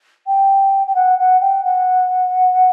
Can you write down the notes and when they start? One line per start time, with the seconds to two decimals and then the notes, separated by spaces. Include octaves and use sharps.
0.26 G5
0.87 G5
0.95 F#5
1.18 F#5
1.40 G5
1.64 F#5